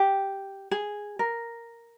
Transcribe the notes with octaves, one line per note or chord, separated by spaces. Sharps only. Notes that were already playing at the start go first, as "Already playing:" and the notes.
Already playing: G4
G#4
A#4